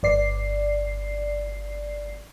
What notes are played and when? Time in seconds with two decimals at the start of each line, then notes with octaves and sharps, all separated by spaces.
0.03 G1 D5 C7